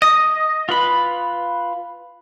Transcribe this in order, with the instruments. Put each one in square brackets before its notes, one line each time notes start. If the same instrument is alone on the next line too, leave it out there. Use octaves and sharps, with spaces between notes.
[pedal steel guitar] D#5 [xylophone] D#6
[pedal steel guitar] F4 B4 B5